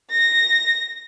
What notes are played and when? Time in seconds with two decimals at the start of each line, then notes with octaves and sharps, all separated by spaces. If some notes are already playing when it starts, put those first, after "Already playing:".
0.11 A#6